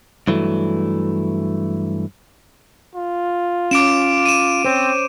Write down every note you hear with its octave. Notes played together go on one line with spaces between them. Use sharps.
G2 E3 F#3 A3
F4
C#4 D6 D7 E7
D#7 E7
C4 C5 C#5